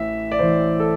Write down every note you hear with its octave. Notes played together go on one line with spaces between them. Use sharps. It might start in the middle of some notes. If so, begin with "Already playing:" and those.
Already playing: A1 A2 E3 E5
D5
A1 A2 E3 C5
A4